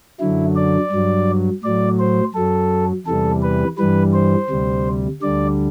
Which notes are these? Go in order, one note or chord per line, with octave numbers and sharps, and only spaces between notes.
F#2 D3 F#3 E4
D5
G2 F#3
A2 F#3 D5
C5
F#2 F#3 A4
E2 C3 E3 G3 A4
B4
G2 E3 G3 B4
C5
D2 C3 G3
D2 D3 G3 D5